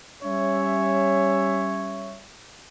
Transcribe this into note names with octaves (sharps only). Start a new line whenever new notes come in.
G3 C#4 C#5 E5